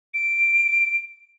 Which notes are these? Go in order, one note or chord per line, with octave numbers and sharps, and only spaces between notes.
D7